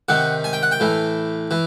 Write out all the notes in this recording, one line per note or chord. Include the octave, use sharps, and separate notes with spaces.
C3 D#3 F#5
G#5
G5
F#5
G5
A2 E3
E3